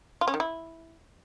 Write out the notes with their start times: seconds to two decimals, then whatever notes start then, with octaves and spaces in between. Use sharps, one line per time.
0.21 F4
0.28 C#4
0.34 D#3
0.40 E4